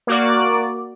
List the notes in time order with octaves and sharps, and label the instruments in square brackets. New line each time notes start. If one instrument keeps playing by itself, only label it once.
[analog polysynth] A#3 F#4 D5